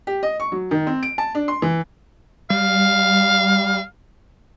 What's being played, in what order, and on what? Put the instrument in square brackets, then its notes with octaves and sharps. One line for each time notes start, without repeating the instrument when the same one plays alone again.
[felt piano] G4
D#5
C#6
F#3
D#3
C4
D7
A5
D4
C6
E3
[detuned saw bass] G3 [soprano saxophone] F5